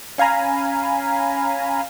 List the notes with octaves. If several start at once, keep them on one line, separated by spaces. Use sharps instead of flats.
C#4 F5 G#5 A#5 B5